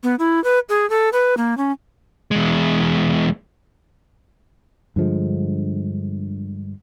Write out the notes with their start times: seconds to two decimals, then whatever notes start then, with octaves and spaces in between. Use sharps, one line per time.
0.03 B3
0.19 E4
0.44 B4
0.69 G#4
0.90 A4
1.13 B4
1.37 A#3
1.57 C#4
2.31 E2 G#3
4.96 G2 D3 F3 G#3